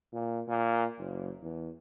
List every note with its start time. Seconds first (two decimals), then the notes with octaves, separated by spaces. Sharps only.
0.13 A#2
0.48 A#2
0.98 F#1
1.42 E2